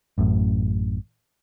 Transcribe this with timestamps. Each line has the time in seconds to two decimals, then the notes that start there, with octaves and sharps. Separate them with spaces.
0.18 A1 F#2 A2